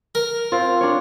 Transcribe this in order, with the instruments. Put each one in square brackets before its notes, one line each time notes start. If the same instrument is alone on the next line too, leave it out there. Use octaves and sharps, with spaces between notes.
[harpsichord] A#4
[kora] C4 F4
D4 C#5